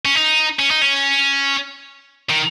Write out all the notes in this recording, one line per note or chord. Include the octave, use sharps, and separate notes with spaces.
C#4
D#4
C#4
D#4
C#4
D#3